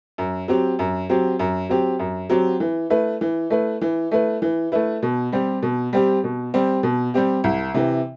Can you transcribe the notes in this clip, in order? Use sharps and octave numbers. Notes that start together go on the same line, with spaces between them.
F#2
F#3 C4 G4
F#2
F#3 C4 G4
F#2
F#3 C4 G4
F#2
F#3 C4 G4
E3
A3 E4 B4
E3
A3 E4 B4
E3
A3 E4 B4
E3
A3 E4 B4
B2
G3 C4 G4
B2
G3 C4 G4
B2
G3 C4 G4
B2
G3 C4 G4
C2
C3 E3